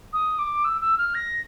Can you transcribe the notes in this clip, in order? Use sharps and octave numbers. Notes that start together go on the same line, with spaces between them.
D#6
D6
E6
E6
F6
A#6